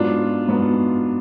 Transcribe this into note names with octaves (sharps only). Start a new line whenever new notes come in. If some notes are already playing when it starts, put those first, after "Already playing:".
Already playing: G#2 F#3 B3 D4 F4
G#2 F#3 B3